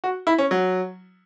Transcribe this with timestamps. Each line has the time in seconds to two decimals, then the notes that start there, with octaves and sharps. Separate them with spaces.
0.04 F#4
0.27 E4
0.38 C#4
0.51 F#3